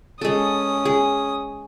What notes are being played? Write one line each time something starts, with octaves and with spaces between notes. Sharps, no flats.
G#3 C#4 A4 D#6
G#4